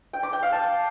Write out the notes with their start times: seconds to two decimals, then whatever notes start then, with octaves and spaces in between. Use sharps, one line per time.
0.13 G5
0.23 D6
0.33 G5
0.43 F5
0.52 A5